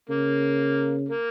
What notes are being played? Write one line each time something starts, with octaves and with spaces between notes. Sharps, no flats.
C#3 A#3
A#3